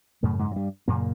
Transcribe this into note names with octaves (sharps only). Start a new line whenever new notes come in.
F#2 A2 C#3 A3
G#2 G#3
F#3
G2 G3
F#2 A#2 C#3 A#3